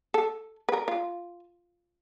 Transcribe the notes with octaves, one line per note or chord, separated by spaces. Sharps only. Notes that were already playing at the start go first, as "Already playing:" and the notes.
A4
B4
A#4
F4